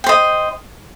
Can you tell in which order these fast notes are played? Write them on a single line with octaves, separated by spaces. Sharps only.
G5 C5 D#5